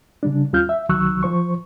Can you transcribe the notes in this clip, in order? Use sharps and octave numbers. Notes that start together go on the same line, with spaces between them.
C#3 G3 D4
D#2 G3 C#4 F4 F6 G6
E5
C2 D#3 F#3 C#6 E6 F#6
F3 C5 C#6